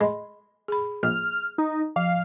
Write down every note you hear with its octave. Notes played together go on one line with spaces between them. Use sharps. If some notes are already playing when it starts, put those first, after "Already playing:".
G#3 B5 C6
G#4 B5
A#1 F6
D#4
F3 F5